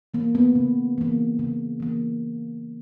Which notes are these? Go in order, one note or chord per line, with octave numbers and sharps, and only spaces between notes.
E3 A#3
B3
C#3
E3 A#3
C#3
E3 A#3